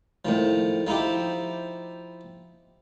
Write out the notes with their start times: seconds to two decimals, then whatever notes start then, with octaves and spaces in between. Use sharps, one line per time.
0.25 A2 D#3 F3
0.87 F3 D#4 E4 G4